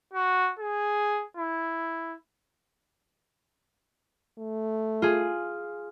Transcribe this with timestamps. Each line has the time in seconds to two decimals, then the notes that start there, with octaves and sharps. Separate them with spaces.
0.14 F#4
0.60 G#4
1.37 E4
4.38 A3
5.02 F4 G#4